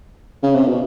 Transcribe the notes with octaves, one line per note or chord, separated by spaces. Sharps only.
C#3
C3
B2